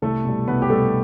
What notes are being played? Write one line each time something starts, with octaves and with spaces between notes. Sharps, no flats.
C2 A3 A4
B2 G3
C2 B3 B4
G4
B2 G3 A3 A4